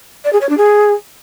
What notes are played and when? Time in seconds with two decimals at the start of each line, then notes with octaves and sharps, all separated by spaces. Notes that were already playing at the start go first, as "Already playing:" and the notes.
0.24 D5
0.32 G#4
0.41 C#5
0.49 D4
0.57 G#4